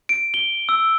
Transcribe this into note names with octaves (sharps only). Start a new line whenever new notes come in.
D7
G7
E6